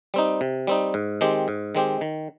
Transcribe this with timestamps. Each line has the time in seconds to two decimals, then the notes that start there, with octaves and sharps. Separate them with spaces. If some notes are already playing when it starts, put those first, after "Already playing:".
0.14 G3 C4 D#4
0.41 C3
0.67 G3 C4 D#4
0.94 G#2
1.21 D#3 G#3 C4 G4
1.48 G#2
1.75 D#3 G#3 C4 G4
2.01 D#3